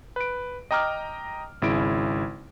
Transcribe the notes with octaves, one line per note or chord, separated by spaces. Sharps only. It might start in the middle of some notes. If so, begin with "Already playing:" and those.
B4 D7
D#5 G5 A#5 D6 F6
G#1 C#3 E4 D7